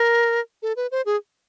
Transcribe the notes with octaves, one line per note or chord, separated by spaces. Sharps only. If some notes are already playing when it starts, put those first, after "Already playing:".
Already playing: A#4
A4
B4
C5
G#4